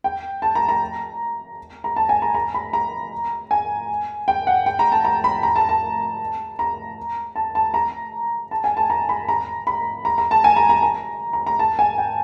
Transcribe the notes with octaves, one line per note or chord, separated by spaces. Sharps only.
G5
A5
A#5
A#5
A#5
A5
G#5
A#5
A#5
B5
A#5
G#5
G5
F#5
G5
A#5
A5
A#5
B5
A#5
A5
A5
A#5
A5
A5
A#5
A5
G#5
A5
A#5
B5
A#5
B5
A#5
A#5
A5
G#5
A#5
A#5
A#5
A#5
A#5
A5
G#5
G5